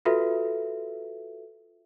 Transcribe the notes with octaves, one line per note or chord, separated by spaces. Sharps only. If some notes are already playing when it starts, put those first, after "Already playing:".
F4 F#4 A4 B4 E5